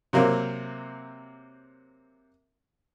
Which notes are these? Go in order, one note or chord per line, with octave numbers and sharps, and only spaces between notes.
C3 F#3 A#3 C4